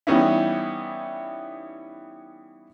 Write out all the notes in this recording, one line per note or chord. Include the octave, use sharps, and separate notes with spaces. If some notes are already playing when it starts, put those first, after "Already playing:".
E3 G3 B3 C#4 D#4 E4